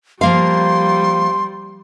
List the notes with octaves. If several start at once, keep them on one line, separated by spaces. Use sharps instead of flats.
F3 G3 A#3 F5 C6